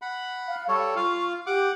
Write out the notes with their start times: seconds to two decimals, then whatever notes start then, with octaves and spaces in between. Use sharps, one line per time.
0.02 F#5 B5
0.47 F5
0.68 G3 A4 C#5 C#6
0.96 F4 F5
1.47 G4 F#5 D6